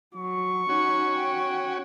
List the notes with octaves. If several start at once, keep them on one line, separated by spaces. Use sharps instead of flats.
F#3 C#6
C#4 D#4 F#4
G5